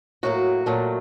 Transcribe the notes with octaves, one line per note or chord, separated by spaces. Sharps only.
A2 F#3 A#3 F#4
A#2 F#3 A3